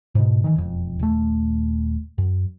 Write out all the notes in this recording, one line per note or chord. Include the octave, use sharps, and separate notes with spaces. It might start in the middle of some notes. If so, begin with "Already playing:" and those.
G#2 B2
D#3 E3
E1 F2
D#1 A3
F#2